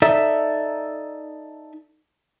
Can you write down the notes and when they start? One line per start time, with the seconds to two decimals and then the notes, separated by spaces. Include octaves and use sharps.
0.02 D#4 A4 D5 E5